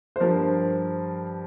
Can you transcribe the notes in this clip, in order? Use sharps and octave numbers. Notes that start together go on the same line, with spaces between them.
C5
G2 F3 A#4